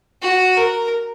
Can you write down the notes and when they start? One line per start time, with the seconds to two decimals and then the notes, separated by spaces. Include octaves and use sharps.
0.22 F#4
0.57 A#4